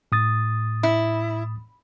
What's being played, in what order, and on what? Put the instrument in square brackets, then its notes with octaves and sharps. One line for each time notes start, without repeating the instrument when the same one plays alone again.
[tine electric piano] A2 D#6 A6
[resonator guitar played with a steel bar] E4